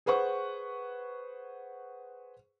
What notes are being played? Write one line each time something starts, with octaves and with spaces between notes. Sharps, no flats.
G#4 B4 C5 F#5 C#6